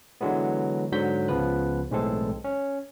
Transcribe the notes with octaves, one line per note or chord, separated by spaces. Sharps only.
D3 E3 F#3 G#3 B3
G#2 D3 F#3 F#4 G6 B6
C#2 C#3 F3 B3 B4 F#6
B1 A2 E3 G#3 C4 A4
C#4